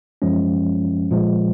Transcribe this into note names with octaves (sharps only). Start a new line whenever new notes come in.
F#2 F3 G#3 C#4
A#2 F3 G#3